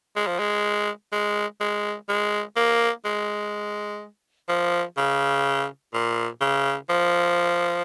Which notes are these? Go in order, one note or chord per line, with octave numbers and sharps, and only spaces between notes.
G#3
F3
G#3
G#3
G#3
G#3
A#3
G#3
F3
C#3
A#2
C#3
F3